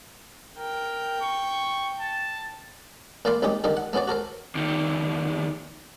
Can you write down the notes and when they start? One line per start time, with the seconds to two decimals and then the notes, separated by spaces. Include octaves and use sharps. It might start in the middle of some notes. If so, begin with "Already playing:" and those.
0.58 A#4 G5
1.21 C#6
1.99 A5
3.25 A#2 A3 D5 F5 B5 C6
3.42 A#1 G3 C#4 D#4 G4 D#6
3.64 D3 D#3 G3 F4 A4
3.77 F#5
3.93 A3 B3 C#4 F#4 D5
4.08 F#4 A4 A#4 C5
4.55 E2 D#3